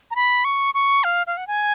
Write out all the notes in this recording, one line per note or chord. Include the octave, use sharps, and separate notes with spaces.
A#5
B5
C#6
C#6
F5
F5
F#5
G#5